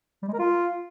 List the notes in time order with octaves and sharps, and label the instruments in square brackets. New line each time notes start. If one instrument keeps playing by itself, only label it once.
[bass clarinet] G3
G#3
A#4
F4